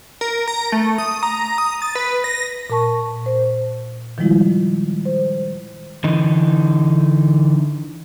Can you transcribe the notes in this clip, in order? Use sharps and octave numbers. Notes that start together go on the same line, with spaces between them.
A#4
A#5
A3
D#6
A#5
D#6
A6
B4
A#6
A#2 A#4 A5 C#6
C5
D#3 F3 G3 G#3 E4 F4
C5
D3 E3 D#4